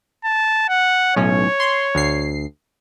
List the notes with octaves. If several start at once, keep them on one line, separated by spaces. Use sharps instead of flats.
A5
F#5
B1 A2 C#4 C#5
C6
D2 C7